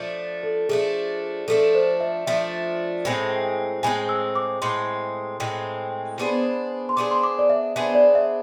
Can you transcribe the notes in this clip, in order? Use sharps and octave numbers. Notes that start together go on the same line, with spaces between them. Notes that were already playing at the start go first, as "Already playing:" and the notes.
Already playing: F3 A3 D4
A4
F3 A3 D4 G#4
F3 A3 D4 A4
C5
E5
F3 A3 D4 E5
A2 G#3 C4
A2 G#3 C4 G#5
E6
D6
A2 G#3 C4 C6
A2 G#3 C4
B3 D4 G#4 C5
C6
B3 D4 G#4 C5 D6
C6
D6
D5
E5
B3 D4 G#4 C5 E5
D5
E5